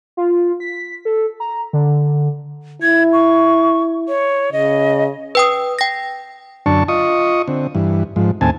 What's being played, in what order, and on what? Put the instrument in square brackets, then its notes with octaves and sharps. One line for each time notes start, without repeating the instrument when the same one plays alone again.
[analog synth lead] F4
B6
A4
A#5
D3
[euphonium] E4 [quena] G#6
[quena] C#6
C#5
[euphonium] C#3 [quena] D#5
[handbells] B4 G5 D#6
G5 A#6
[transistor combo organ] F#2 D3 D4 A5 C#6
F4 D#5 C#6 D#6
D3 C4
G2 E3
G#2 F3
D#2 A2 C4 G#5 A5